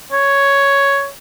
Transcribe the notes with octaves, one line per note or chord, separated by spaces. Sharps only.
C#5